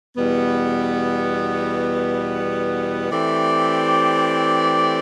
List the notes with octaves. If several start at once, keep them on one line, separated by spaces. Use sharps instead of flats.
E2 B2 G3 B3
E3 A3 C4 G4 D5